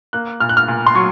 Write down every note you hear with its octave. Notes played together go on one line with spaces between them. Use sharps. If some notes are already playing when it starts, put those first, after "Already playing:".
A#3 F#6
A#2 F6
F#6
F6
A#2
C6
F#3 C#6